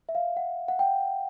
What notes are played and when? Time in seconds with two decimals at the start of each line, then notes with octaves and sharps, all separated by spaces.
0.09 E5
0.15 F5
0.37 F#5
0.68 F#5
0.79 G5